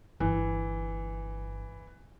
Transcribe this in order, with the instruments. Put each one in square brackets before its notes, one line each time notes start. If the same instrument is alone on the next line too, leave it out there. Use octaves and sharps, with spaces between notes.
[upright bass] G1 [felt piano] E3